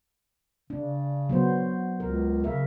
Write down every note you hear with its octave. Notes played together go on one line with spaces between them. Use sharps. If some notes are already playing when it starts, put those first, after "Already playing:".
C#3 D4
F#3 B3 C5
C#2 A#4
C#3 A#4 E5